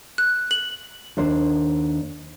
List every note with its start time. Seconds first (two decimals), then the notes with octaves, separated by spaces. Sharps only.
0.18 F#6
0.51 F#7
1.17 D#2 D4 C5